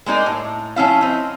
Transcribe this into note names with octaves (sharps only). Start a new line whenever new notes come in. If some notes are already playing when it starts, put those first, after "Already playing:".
G#3 A#3 D#4 D5
A2
F3 C#4 E4 F5
C4 D#4